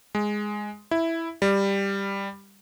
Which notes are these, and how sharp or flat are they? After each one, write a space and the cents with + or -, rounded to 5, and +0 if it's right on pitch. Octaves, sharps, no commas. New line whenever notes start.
G#3 +0
E4 +0
G3 +10